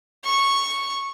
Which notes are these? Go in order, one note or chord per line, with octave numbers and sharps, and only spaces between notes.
C#6